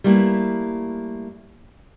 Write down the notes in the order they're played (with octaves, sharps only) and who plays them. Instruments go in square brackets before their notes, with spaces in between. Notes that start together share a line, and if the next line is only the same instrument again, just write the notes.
[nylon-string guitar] G3 A3 A#3 E4